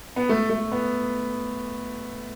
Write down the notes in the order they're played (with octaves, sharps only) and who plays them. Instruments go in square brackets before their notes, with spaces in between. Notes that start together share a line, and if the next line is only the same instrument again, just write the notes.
[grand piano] B3
A3
A3
B3